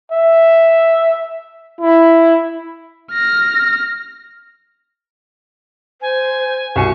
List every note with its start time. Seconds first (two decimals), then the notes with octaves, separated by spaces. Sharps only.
0.12 E5
1.81 E4
3.12 F6 A#6
6.02 C5 G#5
6.76 C2 F#4 G#5 C#6